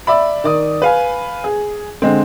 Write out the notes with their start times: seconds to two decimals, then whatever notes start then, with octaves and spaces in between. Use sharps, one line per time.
0.07 D5 E5 B5
0.44 D#3 D5 D#6
0.82 B4 F5 G#5
1.44 G#4
2.02 D3 G#3 C4